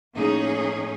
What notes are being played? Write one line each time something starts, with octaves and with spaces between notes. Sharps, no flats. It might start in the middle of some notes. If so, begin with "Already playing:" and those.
F2 A2 A#3 C#4 D#4 G#4